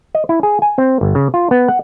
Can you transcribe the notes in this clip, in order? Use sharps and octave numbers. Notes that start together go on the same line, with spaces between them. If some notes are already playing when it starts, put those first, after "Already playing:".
D#5
E4
G#4
G#5
C4
G1
C#3
F4
B3
F#5